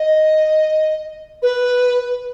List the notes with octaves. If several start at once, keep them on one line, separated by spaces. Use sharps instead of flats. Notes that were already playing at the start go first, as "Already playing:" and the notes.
Already playing: D#5
B4